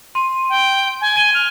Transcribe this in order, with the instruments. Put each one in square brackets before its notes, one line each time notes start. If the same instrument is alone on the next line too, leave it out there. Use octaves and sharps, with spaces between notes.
[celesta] C6 [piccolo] D#7
[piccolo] G5
G#5
[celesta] G#6 D#7 G7
[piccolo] F6